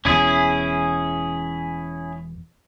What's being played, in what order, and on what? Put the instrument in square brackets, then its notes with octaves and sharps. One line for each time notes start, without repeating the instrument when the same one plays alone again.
[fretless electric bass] E1 E2 [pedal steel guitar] C#4 E4 G#4